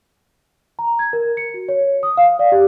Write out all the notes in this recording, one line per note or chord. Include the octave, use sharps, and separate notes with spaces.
A#5
G#6
A#4
C#7
F#4
C#5
D#6
F5
D5
G4